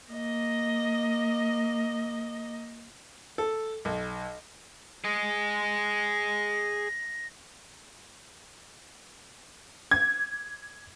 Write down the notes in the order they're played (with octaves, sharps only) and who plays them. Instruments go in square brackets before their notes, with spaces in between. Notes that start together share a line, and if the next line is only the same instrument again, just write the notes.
[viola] A#3 D#5
[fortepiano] A4
B1
[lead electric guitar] G#4 D#5 [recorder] A#6
[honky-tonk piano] G#6